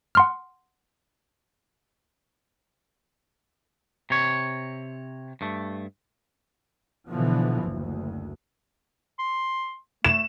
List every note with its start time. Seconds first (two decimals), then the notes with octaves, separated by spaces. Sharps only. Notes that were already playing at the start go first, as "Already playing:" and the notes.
0.15 F#5 C6 F6
4.10 C3 C#5
5.41 G2 A3
7.08 B2 D3 E3 F3
7.65 F#1 D2
9.19 C6
10.04 A3 E7